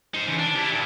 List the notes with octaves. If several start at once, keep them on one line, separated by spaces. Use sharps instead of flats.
D#4 C5
C#3 E3
D4
E4 G4
G2 A#2